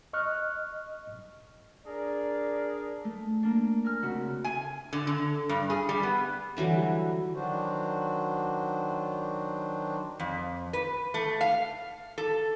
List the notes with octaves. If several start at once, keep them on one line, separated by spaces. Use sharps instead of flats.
D#5 C#6 F6 F#6
D4 G#4 A#4 D5
A3
A#3 D4
A#4 G#5 F6
C#3 C4 F#4 E5
G#5
D3
D3
G2
G#4
G3
B3
D3 E3 F#3 G3
D#3 F#3 D4 F#4 C5
F2
B4
A3
F5
A4